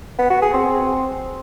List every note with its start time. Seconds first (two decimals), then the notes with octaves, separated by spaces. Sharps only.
0.19 B3
0.30 F#4
0.42 G#4
0.54 C4